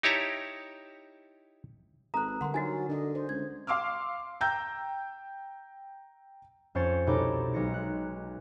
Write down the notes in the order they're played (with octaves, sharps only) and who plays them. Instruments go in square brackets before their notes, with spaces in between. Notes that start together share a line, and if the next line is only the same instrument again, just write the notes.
[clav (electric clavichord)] D#4 E4 G4 C#5 A5 A#5
[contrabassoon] G#1 [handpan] A4 B4 [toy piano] A#5 [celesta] D#6 F#6
[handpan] D3 G3 A#4 [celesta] F#5 C6
[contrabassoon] F#3 [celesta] D#4 A6 [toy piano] F#4 G#5
[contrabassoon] D3 [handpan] D4 D#5
[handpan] C5
[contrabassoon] C#2 [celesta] G#6
[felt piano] F5 C6 D6 E6 F6
G5 A#5 E6 G6
[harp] F2 C#4 C5 C6 A6 C#7
C2 B2 D#4 A4 C#5 D6
B1 G#3 A#6 C#7
F#6